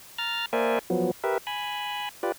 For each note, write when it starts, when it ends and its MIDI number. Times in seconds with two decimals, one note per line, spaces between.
0.18 0.46 82
0.18 0.46 89
0.18 0.46 93
0.53 0.79 58
0.53 0.79 70
0.53 0.79 72
0.53 0.79 74
0.53 0.79 76
0.53 0.79 80
0.90 1.11 53
0.90 1.11 54
0.90 1.11 59
1.24 1.38 67
1.24 1.38 70
1.24 1.38 71
1.24 1.38 76
1.47 2.09 80
1.47 2.09 83
2.23 2.32 65
2.23 2.32 67
2.23 2.32 71
2.23 2.32 74